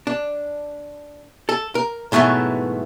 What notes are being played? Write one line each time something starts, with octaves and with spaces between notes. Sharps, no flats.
D4
A4
A#4
G#2 B2 E3 F#3 A3